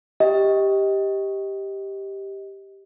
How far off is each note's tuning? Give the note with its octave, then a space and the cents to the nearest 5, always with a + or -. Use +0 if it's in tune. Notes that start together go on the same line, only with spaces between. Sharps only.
G4 +0 D#5 +20